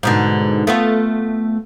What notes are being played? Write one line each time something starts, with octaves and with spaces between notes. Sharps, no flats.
G#2 B2 D3
A3 B3 F4